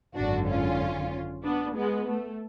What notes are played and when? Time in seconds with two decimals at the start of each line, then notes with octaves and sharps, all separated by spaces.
0.15 G#1 F#2 D3 D4 F#4
0.47 C#4 F4
1.44 B3 D4
1.76 G#3 B3
2.08 A3